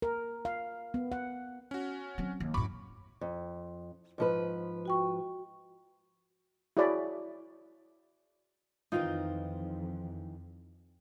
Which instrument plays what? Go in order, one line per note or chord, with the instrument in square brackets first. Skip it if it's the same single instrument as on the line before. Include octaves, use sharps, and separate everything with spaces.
[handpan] A#4
F5
B3
F#5
[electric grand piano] C#4 F#4
[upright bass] F#3 C4
D#2
[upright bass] F#2 A2 [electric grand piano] B5 C#6 D6
[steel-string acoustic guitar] F2
G#2 F3 B4
[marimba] F#4 G5 C#6
[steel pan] E4 F#4 G#4 C#5 D5 B5
[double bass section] F2 [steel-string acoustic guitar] D#3 E3 C5 [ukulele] D#4 F4